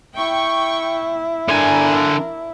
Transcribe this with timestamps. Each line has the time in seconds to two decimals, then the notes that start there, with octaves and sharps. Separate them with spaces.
0.16 E4 G5 C#6
1.48 D3 D4 A#4 G#5